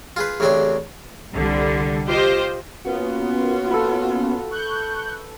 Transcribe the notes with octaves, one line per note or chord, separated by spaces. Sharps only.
F4 G#4 B4
A1 E2 C#3 C4 D4 C#5
C2 D3 G3
F4 G4 C5 D#5
A#3 B3 C#4 F4 F#4
A4 B4
C#6 F#6 G6